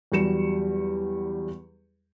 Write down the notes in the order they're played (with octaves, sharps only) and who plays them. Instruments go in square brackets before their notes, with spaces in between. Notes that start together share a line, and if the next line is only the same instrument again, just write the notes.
[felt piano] E2 F#3 G3 C#7 E7